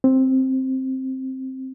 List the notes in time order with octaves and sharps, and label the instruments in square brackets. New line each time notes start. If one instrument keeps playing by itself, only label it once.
[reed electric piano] C4